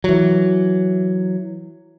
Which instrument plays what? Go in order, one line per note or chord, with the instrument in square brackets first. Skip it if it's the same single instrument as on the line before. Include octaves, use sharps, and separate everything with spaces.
[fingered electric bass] E3 F#3